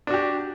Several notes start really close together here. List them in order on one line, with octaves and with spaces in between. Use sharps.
D4 F#4 G4